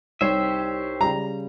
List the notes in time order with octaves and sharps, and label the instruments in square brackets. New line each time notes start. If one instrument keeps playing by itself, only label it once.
[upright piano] C2 D#4 C#5 [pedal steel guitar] G4 C5 E5
[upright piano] C#3 G3 [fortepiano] A#5